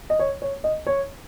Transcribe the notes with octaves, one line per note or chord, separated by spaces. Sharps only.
D#5
C#5
C#5
D#5
C#5